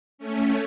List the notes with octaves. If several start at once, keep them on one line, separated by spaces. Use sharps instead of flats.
A3 C#4